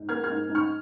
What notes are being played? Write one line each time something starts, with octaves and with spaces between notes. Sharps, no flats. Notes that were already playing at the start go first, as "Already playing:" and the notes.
Already playing: G#2
A#3 F6 G#6
F6 G#6
G#2
G#2
C#6 F6